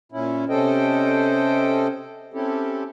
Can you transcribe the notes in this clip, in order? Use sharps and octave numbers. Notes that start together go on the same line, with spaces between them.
A#2 C#4 E4
C3 C#4 A4 C5 D#5 G5
C4 C#4 E4 G4 A4